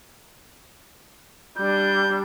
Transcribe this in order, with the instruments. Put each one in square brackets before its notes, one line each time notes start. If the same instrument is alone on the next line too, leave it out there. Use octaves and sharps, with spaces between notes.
[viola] G3 D4 [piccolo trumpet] G6